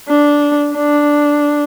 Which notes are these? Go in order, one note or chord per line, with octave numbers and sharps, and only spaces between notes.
D4
D4